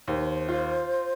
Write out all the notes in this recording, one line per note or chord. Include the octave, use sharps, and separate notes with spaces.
D#2 C5
F4